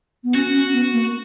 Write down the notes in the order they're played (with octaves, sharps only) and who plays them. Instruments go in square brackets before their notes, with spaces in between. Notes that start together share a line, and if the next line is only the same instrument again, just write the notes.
[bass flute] B3
[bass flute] C#4 [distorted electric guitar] F#4
[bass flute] C#4
B3
A#3